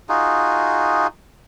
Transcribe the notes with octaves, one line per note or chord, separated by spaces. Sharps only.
D#4 F4 F#4 G#4